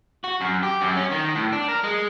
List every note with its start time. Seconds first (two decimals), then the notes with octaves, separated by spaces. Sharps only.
0.24 F#4
0.41 F#2
0.63 G4
0.81 F#2
0.97 C#4
1.12 D#3
1.35 A2
1.53 D4
1.68 A#4
1.84 G#3